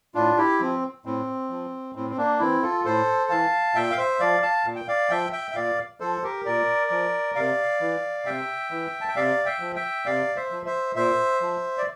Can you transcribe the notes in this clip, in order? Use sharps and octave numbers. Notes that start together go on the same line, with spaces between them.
A2 D4 F4
E4 G4
F3 C4
A2 C4
F3
A2 C4
C4
A#3 D4
E3 C4 E4
F4 A4
A2 A4 C5
E3 F5 A5
A#2 E5 G5
F5
C5 E5
F3 D5 F5
F5 A5
A#2
G5
D5 F5
F3 E5 G5
E5 G5
E5
A#2 D5 F5
F3 A4 C5
G4 A#4
A#2 A#4 D5
F3
C3 D5 F5
E3
C3 E5 G5
E3
A5
G5
C3 D5 F5
E5 G5
F3
E5 G5
C3 D5 F5
C5 E5
F3
C5 E5
A#2 C5 E5
F3
D5